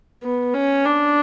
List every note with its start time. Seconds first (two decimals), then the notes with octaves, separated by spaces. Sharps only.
0.23 B3
0.54 C#4
0.85 D4